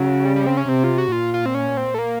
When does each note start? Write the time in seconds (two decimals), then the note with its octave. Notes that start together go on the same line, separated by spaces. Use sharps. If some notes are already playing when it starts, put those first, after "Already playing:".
Already playing: C#3 F#3
0.25 G3
0.36 G3
0.46 C4
0.57 C#4
0.68 C3 C4
0.84 F4
0.98 F#4
1.12 A#2 F4
1.34 F4
1.46 C4
1.55 C#4
1.77 C4
1.94 A3
1.99 A#3